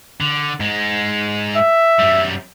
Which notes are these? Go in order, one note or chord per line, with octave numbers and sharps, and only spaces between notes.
D3
G#2 G#3
E5
F#2 G3